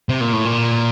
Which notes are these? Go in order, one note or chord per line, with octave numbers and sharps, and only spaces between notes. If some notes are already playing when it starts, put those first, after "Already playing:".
C3
A#2
A2
A#2